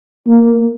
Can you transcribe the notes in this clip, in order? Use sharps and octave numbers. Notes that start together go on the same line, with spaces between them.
A#3